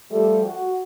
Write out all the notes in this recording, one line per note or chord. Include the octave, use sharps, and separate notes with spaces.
F3 G3 A3 G4 A4
F#4